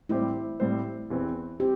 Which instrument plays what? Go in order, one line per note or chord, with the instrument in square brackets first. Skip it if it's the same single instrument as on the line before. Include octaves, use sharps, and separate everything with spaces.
[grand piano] A2 G3 C4 G4 C5 [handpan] E4
[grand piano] A2 G3 C4 G4 C5
E2 E3 C4
[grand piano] C4 [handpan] G4